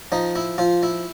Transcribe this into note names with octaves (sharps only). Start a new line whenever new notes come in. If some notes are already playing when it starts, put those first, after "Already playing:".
F3 D#4
E4
F3 F4
E4